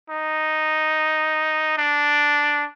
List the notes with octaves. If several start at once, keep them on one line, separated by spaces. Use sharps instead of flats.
D#4
D4